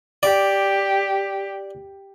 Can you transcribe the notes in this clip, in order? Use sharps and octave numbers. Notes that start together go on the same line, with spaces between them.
G4 D5